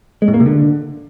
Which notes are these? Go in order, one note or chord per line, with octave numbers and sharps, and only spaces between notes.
G#3
A2
A#3
C3
D3